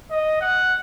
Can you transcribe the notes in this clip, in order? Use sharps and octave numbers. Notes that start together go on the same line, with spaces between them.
D#5
F#5